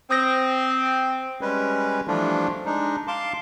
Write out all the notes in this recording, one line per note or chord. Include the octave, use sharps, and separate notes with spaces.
C4 D#6 G6 A#6
G3 G#3 C#4 B4
E3 F3 G3 A3 D4 F4
G#3 D4 D#4
F5 A5 C6 D6